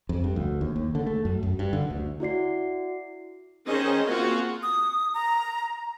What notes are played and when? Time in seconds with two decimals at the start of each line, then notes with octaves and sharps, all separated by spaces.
0.09 F2
0.24 G2
0.36 D2
0.61 D#2
0.76 D#2
0.95 D3
1.07 A3
1.25 F#2
1.43 F#2
1.59 G2
1.73 D3
1.90 D2
2.20 E4 F#4 D5 C7
3.67 D#3 C#4 G#4 C5 D#5
4.06 A#3 C4 F4 F#4 G#4
4.63 D#6
5.14 A#5